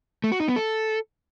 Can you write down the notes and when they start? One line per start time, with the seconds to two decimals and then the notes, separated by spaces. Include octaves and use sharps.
0.24 A3
0.32 F#4
0.40 D#4
0.48 B3
0.56 A4